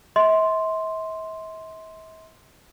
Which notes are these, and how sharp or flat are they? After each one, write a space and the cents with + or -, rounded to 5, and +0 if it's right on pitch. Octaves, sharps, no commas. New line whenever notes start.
E5 -45 C6 +0